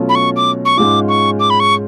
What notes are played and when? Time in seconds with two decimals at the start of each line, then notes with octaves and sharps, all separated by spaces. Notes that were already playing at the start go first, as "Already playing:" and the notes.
Already playing: B2 F#3 A3 C#4 F4
0.09 B5
0.15 C#6
0.36 D6
0.65 C#6
0.77 G#2 G#3 C#4 F4 D6
1.08 C#6
1.39 D6
1.50 B5
1.60 C#6